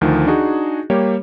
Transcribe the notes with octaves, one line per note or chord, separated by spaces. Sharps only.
D2 D#3 F3
D4 D#4 F#4 G#4
G3 A#3 G4 C#5